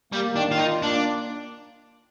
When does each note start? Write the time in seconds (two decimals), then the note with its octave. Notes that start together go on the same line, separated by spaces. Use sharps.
0.13 G3 A#3
0.31 D#3
0.36 D4
0.47 D#3 F4
0.59 D#4
0.65 F4
0.82 A#3 D4